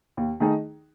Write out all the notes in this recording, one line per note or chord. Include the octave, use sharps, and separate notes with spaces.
D#2
D#3 A3 D#4 G#4